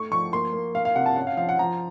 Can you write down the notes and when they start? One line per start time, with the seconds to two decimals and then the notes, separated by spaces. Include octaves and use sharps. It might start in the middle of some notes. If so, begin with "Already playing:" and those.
Already playing: A3 C#6
0.11 F3 C#6
0.32 A#3 C6
0.53 A#3
0.75 A#3 F5
0.85 F5
0.95 C3 F#5
1.06 A5
1.16 C#4 F#5
1.27 F5
1.37 F3 F5
1.49 F#5
1.59 F3 A#5